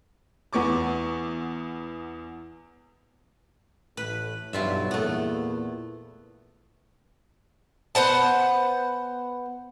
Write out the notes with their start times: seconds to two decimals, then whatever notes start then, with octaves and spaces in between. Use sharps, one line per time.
0.53 E2 B3 C#6 D6
3.97 A1 A2 B4
4.53 B1 G2 F#3 E4 F4 E5
4.91 E2 A#2 A3 B3
7.95 B3 C5 F#5 A5